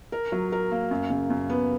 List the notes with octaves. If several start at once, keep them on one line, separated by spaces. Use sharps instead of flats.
A#4
F#3
A#4
A#3
F#2
C#3
F#2
B3